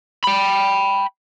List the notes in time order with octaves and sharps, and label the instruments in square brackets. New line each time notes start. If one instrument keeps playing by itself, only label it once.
[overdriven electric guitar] G5 B5